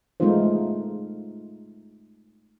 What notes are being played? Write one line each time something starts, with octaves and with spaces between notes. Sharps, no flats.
G#3 A3 B3 D#4 F4 C5